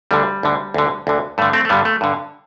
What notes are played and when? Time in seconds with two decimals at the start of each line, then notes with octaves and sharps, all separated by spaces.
0.11 D2 D3 G3
0.43 D2 D3
0.74 D2 D3
1.07 D2 D3
1.38 G2 D3 A3
1.53 A3 C4
1.65 A3
1.69 G2 D3 G3 B3
1.85 A3
2.01 G2 D3